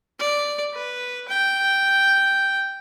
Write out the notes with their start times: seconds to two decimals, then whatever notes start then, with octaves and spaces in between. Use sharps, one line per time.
0.19 D5
0.74 B4
1.29 G5